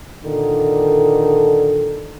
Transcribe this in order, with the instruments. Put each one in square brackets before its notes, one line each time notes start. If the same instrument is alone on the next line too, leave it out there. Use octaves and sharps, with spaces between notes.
[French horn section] A#2 D3 D#3 A4